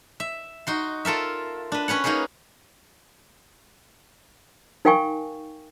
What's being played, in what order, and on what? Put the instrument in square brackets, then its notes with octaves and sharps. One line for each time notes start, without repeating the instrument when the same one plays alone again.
[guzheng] E5
D#4 F#4 C6
F4 A4 A#4 E5
D4 B4
C#4 B4 C#5 F#5
A#3 D#4 F#4 G#4 B4
[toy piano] D#4 A#4 F5 G5 G#5 C#6